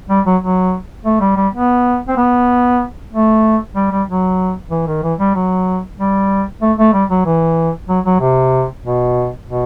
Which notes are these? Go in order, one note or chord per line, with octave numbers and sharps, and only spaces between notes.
G3
F#3
F#3
A3
G3
G3
B3
C4
B3
A3
G3
G3
F#3
E3
D#3
E3
G3
F#3
G3
A3
A3
G3
F#3
E3
F#3
F#3
C3
B2
B2